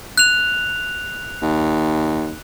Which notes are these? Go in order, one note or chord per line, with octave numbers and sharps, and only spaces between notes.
F#6 F7
D#2